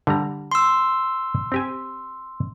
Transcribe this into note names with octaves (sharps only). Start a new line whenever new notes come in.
D3 G3 A#5
C6 E6
C4 G4 G#5